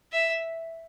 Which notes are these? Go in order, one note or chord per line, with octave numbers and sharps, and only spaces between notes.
E5